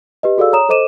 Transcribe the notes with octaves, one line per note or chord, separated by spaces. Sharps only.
G4 B4 D#5
F#4 G#4 A4 D5 F5 E6
C#5 A#5 D#6 E7
A4 C5 D#5 D6 D#7 E7